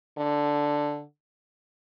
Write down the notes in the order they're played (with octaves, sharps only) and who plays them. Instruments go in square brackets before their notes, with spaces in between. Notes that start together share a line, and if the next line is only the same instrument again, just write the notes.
[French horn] D3